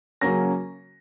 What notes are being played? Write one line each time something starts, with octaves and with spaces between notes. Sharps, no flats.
C#3 F#3 A#3 C#4 A#6